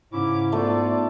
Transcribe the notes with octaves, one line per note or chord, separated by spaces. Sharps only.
G#2 C#3 C#4 E4 D6
A3 B3 F4 D5